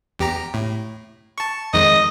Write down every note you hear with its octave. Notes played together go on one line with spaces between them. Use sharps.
E2 G4 A#5
A2
A5 C#6
F2 D#3 G#3 D#5